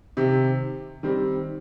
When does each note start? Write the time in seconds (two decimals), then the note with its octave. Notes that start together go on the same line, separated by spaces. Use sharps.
0.17 C3 D#3 C4 G4
1.03 D#3 G3 C4 G4